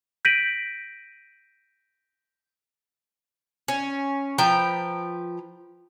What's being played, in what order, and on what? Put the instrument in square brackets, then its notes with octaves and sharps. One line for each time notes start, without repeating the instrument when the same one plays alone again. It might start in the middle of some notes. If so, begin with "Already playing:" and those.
[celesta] G6 A#6 B6 D7 D#7 F#7
[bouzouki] C#4
F3 B4 G5 A#5